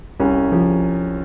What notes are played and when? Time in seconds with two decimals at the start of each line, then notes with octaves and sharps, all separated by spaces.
0.20 C2 C#4
0.52 F3